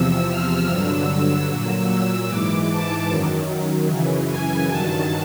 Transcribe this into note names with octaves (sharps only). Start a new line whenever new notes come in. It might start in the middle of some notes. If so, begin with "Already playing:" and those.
Already playing: E2 C3 F3 E6
F6
G2 D3 F#3 E6
E6
A#2 F#3 E6
E6
G#2 E3 D6
A5
F#2 D#3 F#3
F#2 C#3 E3
G#5
G2 D#3 F#3 A5